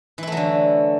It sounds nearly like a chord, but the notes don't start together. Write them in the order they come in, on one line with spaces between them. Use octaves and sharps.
E3 E4 A3 F#3 D3